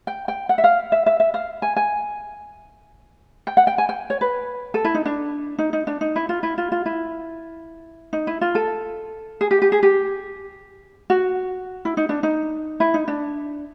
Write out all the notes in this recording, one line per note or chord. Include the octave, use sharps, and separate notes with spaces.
G5
G5
F#5
E5
F5
E5
E5
E5
F5
G#5
G#5
G5
F#5
G5
G#5
G5
C#5
B4
A4
E4
D#4
D4
D#4
D#4
D4
D#4
E4
F4
E4
F4
F4
E4
D#4
E4
F4
A4
G#4
G4
G4
G#4
G4
F#4
E4
D#4
D4
D#4
E4
D#4
D4